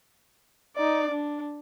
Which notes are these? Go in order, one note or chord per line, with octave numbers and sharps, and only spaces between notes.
D#4 D5
D4